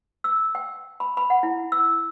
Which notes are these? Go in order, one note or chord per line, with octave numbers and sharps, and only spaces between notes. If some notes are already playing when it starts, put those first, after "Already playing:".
E6
G5
B5
B5
F#5
E4
E6